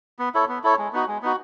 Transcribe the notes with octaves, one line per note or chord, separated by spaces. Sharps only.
B3
E4 A4 C#5
B3
E4 A4 C#5
G#3
B3 D#4 F#4
G#3
B3 D#4 F#4